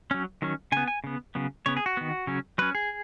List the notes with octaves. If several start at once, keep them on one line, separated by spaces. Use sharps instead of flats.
F#3 C#4
D#3 F#3 C#4
C#3 B3 G#5
G#5
C#3 B3
C#3 F#3 B3
C#3 B3 C#5
G#4
F#4
D#3 B3
C#3 F#3 C#4
F#3 C#4 B4
G#4